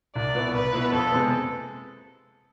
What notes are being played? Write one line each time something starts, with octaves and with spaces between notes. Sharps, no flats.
C2 D5
B2 B3 E4
C2 B4
B2 B3 E4
F2 A4
C3 G#3 B3